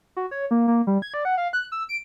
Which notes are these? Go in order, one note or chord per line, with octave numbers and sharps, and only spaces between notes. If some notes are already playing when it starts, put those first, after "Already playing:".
F#4
C#5
A#3
A#3
G3
G#6
D5
F#5
F5
F#6
E6
D7